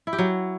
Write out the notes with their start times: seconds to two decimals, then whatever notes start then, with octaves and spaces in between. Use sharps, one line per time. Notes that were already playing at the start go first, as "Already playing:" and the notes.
0.07 E4
0.13 G4
0.18 F#3